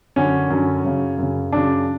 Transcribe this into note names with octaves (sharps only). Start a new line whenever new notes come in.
F#2 D3 C#4
F#2 D3
F#2 C#3
F#2 C#3
F#2 C#3 D4